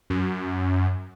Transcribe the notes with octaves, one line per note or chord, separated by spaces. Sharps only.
F#2